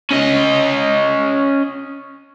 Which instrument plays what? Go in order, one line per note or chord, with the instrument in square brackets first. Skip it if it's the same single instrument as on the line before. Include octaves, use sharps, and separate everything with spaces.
[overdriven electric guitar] C#4 D#5